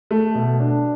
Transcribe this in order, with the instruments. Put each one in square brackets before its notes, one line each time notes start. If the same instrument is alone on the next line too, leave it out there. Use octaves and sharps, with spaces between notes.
[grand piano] A3
B2
D4